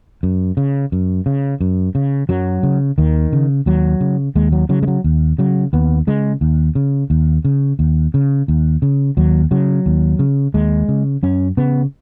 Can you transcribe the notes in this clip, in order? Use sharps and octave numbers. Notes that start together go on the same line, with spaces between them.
F#2
C#3
F#2
C#3
F#2
C#3
F#2 F#3
C#3
D#2 D#3
C#3
D#2 F#3
C#3
D#2 G#3
F#3
C#3 F#3
G#3
F#3
D#2
C#3 F#3
D#2 B3
C#3 G#3
D#2
C#3
D#2
C#3
D#2
C#3
D#2
C#3
D#2 F#3
C#3 F#3
D#2
C#3
D#2 G#3
C#3
F#2 C#4
C#3 B3